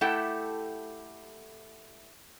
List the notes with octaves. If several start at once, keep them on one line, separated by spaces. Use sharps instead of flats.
A3 E4 G4 A4 F#5 G5